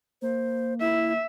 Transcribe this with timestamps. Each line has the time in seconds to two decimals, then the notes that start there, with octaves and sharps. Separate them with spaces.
0.22 A#3 C5
0.81 E4 E5